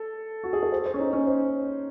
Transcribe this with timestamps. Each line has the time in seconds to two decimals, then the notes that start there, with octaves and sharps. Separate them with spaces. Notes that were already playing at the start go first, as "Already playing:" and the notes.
Already playing: A4
0.44 F#4
0.53 G#4
0.63 A4
0.72 C5
0.86 C5
0.94 C#4
1.00 D#4
1.13 C#4
1.26 C5